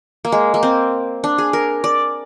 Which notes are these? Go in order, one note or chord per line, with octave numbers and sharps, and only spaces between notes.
A#3
G#3
A#3
C4
D4
G#4
A#4
D5